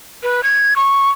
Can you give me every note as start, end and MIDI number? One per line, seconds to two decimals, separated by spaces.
0.23 0.43 71
0.43 0.74 92
0.76 1.10 85